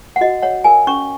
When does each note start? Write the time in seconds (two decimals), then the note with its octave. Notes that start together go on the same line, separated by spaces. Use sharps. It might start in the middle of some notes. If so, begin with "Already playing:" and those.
0.16 F#5
0.21 F#4 D#5
0.42 C#5 F#5
0.64 A#4 G#5
0.87 C#4 C#6